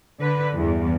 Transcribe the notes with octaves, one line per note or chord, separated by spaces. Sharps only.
D3 B4
E2 G2